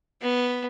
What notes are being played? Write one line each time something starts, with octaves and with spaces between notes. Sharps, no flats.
B3